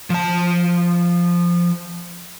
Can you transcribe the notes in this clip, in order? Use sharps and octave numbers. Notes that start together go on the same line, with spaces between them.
F3 A5